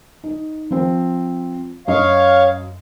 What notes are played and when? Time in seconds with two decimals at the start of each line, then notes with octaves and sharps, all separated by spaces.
0.24 D#4
0.71 F3 C4 F4
1.88 F#2 C#5 D#5 F5 D#6